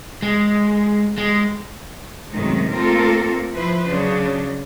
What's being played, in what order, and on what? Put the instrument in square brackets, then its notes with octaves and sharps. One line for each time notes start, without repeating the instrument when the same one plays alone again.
[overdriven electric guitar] G#3
G#3
[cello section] F#2 A2 C3 D#3 F#3 G#3
A3 A#3 C4 F4 A4 A#4
F3 E4 B4 C5
C#3 F#3 D4